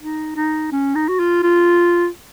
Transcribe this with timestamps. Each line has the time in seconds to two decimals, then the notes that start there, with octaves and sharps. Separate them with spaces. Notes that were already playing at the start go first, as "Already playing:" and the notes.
0.01 D#4
0.36 D#4
0.72 C#4
0.95 D#4
1.09 F#4
1.20 F4
1.43 F4